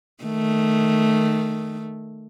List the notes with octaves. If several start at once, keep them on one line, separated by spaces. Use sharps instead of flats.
D#3 A3